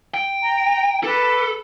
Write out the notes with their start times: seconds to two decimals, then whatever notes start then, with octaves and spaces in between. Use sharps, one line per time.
0.14 G5
0.41 A#5
1.04 A4 B4 D6